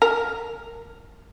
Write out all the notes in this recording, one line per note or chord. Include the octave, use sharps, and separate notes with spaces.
A#4